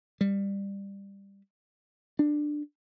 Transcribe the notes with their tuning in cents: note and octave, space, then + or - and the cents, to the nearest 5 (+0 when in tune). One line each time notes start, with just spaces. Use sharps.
G3 +15
D4 +15